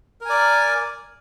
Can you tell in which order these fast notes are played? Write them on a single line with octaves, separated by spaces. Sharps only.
A#4 G#5 D5